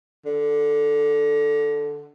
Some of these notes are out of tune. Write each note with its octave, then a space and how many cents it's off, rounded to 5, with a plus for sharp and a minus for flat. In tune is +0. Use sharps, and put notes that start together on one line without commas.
D3 -5